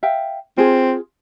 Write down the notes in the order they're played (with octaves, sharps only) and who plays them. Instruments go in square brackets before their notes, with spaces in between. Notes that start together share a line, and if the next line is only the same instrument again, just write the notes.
[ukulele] E5 F5 G5
[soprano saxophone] C4 [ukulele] F4 G#4